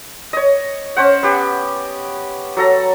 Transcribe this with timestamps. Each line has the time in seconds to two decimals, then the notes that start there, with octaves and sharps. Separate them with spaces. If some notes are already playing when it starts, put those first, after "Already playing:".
0.33 C#5 D#5
0.96 C#4 C5 F#5
1.23 B3 G4
2.56 F#3 A4 A#5